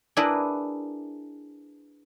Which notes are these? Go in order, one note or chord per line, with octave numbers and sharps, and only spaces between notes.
D4 E4 G#4 A#4 B4